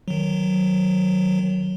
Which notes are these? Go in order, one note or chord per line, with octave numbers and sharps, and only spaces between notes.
D#3 F#3